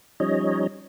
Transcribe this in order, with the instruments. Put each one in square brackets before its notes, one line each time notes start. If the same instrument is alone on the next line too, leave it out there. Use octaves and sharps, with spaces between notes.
[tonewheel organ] F3 G3 C#4 D#4 C#5 D#5